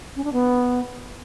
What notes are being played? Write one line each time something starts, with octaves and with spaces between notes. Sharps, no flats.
C#4
D4
B3